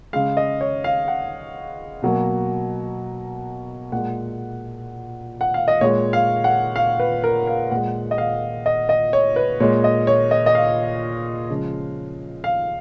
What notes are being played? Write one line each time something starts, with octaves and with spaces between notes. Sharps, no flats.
C#3 G#3 F5
D#5
C#5
F5
F#5
B2 F#3 A#3
A#2 G#3 F#5
F#5
F5
D#5
A#2 G#3 C#5
F5
F#5
F5
B4
A#4
F5
A#2 G#3 F#5
D#5
F5
D#5
D#5
C#5
B4
A#2 G#3 C#5
D#5
C#5
D#5
D#5
F5
C#3 F3 G#3
F5